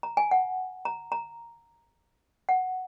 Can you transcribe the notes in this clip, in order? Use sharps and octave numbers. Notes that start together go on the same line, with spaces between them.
A#5
G#5
F#5
A#5
A#5
F#5